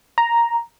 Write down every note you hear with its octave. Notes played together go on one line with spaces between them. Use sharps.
A#5